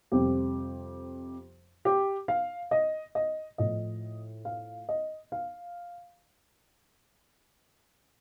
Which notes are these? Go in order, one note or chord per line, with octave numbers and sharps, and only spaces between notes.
F2 C3 G3 G4
G4
F5
D#5
D#5
A2 F3 D#5
F5
D#5
F5